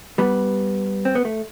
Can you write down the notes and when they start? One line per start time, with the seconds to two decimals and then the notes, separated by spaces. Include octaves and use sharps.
0.18 G3 B3
1.05 C4
1.15 B3
1.25 A3